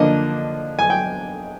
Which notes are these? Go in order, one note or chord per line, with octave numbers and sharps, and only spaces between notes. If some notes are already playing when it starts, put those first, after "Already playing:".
Already playing: D3 F3 A#3 D4 D#5
G#5
G5